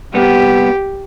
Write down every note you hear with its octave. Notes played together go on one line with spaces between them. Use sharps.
C2 B3 G4